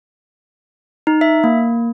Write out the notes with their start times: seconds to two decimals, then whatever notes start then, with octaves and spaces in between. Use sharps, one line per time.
1.07 D#4
1.21 E5
1.44 A#3